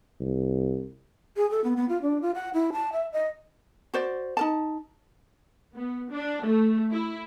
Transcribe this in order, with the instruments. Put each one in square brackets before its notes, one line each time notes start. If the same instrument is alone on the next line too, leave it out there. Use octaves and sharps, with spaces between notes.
[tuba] C2
[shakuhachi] G#4
A4
B3
B3
F4
D4
F4
F#5
E4
A5
E5
D#5
[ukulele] F#4 C5 D5
D#4 A#4 A5
[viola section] B3
D4
A3
E4